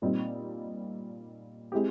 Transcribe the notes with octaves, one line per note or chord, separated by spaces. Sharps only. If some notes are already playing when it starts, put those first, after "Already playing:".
A#2 G3 C4 D#4
G#3 C4 E4 G4